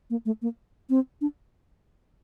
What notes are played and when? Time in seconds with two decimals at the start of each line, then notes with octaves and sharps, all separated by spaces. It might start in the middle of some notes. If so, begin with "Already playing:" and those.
0.10 A#3
0.25 A3
0.42 A#3
0.90 C4
1.21 D4